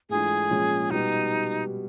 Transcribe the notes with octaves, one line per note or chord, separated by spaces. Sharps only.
G#2 E3 A3 D4 F4 G#4
A#2 F3 G#3 C#4
B2 G3 B3 D#4